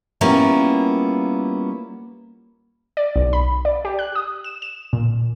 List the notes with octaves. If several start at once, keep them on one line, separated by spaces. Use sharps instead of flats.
G3 A#3 B3 C#4 E4 F4
D5
B1
B5
D5
G4
F#6
D#6
E7
E7
A#2